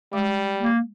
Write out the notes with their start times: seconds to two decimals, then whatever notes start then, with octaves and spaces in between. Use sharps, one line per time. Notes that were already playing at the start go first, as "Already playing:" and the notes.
0.13 G3 G#3 D6
0.60 A#3